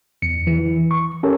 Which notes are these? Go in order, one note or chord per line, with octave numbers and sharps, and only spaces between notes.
E2 C#7
E3
C#6
C#4 G4 A4 A#4 C#5